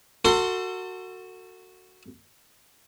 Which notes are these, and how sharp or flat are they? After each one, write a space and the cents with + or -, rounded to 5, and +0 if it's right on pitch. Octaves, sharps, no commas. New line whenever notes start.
F#4 +0 A4 +35 C6 +0